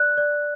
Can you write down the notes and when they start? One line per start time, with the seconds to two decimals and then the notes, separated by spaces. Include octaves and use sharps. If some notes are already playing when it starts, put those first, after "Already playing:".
Already playing: D5 F#6
0.18 D5